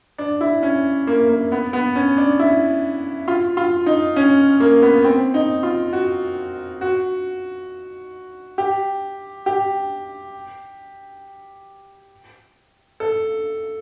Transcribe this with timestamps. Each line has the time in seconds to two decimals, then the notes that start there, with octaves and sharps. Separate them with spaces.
0.18 D4
0.41 E4
0.63 C#4
1.07 A#3
1.29 A#3
1.52 B3
1.73 B3
1.95 C#4
2.18 D4
2.39 E4
3.28 F4
3.57 F4
3.86 D#4
4.16 C#4
4.60 A#3
4.82 B3
5.04 C4
5.34 D#4
5.63 F4
5.93 F#4
6.81 F#4
8.58 G4
9.46 G4
13.00 A4